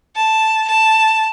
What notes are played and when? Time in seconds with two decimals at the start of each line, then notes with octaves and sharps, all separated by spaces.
0.16 A5
0.68 A5